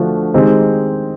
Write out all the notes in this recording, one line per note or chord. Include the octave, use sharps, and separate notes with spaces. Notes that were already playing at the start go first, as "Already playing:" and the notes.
Already playing: D3 F3 A3 D4 F#4
D#3 G#3 C4 D#4 G4